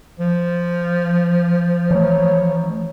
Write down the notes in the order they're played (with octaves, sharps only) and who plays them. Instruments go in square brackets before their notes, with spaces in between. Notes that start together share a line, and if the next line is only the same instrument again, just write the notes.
[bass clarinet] F3
[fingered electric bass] E3 A3 [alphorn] C#5